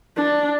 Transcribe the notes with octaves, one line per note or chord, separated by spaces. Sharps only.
D4